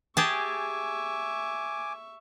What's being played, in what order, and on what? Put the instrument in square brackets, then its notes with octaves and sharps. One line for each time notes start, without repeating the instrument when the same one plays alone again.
[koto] G4 G#4 A5 [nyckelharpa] E5 C#6 [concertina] G#5 D6